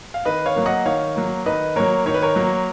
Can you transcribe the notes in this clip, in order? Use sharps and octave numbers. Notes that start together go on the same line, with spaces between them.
F5
D#3 B4 D#5
C#5 F5
F#3 A#3
D#5 F#5
D#3 C#5 F5
F#3 A#3
D#3 B4 D#5
F#3 A#3 A#4 C#5
D#3 C#5
B4
A#4 C#5
F#3 A#3